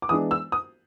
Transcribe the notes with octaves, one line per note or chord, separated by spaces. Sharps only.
D6
E3 G#3 B3 D4 D#6
E6
D#6